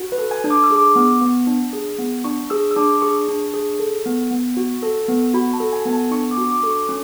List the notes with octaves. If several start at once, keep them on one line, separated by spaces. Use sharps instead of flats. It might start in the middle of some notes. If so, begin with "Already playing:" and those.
Already playing: F#4
B4
A4
G#5
D4
D6
E6
G#4
D6
B3
B3
D4
G#4
B3
D4 C#6
G#4 E6
E6
D4 D6
G#4 C#6
D4
G#4
A4
B3
B3
F#4
A4
B3
F#4 B5
A5
A4
G#5
B3 G#5
A5
D4 C#6
D6
F#4
D6
A4
C#6
C#4